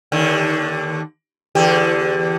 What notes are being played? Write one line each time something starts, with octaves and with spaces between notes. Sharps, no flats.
D#2 D3
E2 D3 G4